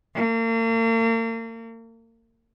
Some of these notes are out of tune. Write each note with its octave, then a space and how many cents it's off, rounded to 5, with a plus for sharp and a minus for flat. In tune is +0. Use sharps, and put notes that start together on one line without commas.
A#3 -40